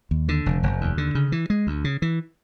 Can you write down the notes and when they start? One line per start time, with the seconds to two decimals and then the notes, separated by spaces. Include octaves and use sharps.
0.11 D#2
0.29 D3
0.46 F1
0.63 F1
0.81 D#2
0.98 D3
1.15 C#3
1.32 E3
1.50 G#3
1.67 D2
1.84 C#3
2.02 E3